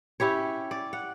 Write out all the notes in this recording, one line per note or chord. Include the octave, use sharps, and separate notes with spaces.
C#4 E4 G4 C#5
D5
F#5